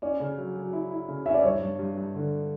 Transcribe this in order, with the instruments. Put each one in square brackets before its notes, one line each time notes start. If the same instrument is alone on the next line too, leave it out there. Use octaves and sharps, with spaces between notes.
[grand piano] C#4 [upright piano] D5
[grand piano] C#3
F#3
F#3
E4
E4
C#3
[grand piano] C#4 [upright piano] E5
[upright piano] D5
[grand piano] G2 [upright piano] C#5
[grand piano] G2
G2
G2
D3